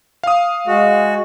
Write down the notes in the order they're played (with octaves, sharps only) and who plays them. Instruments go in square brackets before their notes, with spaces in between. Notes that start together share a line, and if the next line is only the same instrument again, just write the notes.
[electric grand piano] F5 D#6
[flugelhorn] G#3 [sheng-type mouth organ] F#4